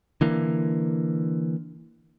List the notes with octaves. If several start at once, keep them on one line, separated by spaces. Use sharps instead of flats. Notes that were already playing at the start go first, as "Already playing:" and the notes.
D3 E3 A#3